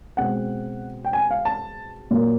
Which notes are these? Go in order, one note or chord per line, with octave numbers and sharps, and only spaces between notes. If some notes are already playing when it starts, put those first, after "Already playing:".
B2 G#3 C4 F#5
G5
G#5
F5
A5
A#2 F#3 A#3